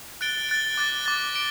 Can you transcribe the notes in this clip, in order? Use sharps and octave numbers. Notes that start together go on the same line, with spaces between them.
F#6 A6 D7 G7
F#6 A6 D7 G7
D6 F#6 A6
D6 F#6 A6
D7 G7